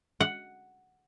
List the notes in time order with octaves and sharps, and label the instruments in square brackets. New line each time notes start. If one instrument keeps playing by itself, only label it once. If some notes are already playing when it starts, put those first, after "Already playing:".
[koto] F#5